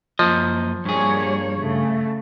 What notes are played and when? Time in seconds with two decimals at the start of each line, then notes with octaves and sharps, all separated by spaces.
0.19 F#2 F3 A#3 D#5
0.85 G2 G3 A#3 G#4 C#5
1.58 C#3 A3